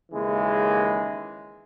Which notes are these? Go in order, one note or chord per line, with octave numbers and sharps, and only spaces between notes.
D#2 C#3 E3 G#3